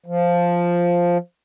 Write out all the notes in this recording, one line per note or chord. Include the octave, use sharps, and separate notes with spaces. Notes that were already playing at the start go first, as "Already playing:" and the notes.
F3